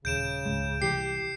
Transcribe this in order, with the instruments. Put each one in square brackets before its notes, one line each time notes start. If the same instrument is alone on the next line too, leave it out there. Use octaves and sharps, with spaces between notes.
[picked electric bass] D#1 [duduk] C#3 [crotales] G6 D7 E7
[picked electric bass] C#2 G#2 G#3
[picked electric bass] C2 E3 [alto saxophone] G4 [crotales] C7